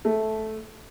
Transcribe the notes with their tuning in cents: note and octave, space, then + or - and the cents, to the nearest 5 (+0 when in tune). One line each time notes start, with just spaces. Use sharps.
A3 -10